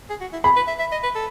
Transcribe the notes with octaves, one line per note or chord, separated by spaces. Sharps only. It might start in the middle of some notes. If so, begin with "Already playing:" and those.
G#4
F#4
E4
G#4 B5
B4
E5
E5
D#5
B4
A4